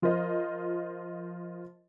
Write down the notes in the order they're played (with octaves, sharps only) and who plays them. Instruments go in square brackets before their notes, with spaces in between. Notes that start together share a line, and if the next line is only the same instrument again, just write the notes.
[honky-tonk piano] F3 F4 A#4 C5 D#5